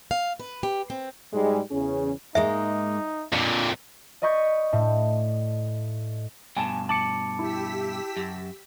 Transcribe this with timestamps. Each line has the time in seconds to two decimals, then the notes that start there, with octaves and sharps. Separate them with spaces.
0.11 F5
0.40 B4
0.63 G4
0.90 C4
1.33 G#2 G3 G#3
1.71 E2 C#3 C#4 G#4
2.35 G#2 G#3 A#3 D#4 E5
3.33 F2 A#2 D4
4.22 D5 D#5 B5 C#6 G6
4.73 A2
6.56 G2 B2 G#5 A5 E7
6.89 A5 D6 C#7 F#7
7.39 E4 G4 E6 B6
8.17 F#2